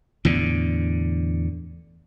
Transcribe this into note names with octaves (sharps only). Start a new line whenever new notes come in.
E2 A2 D3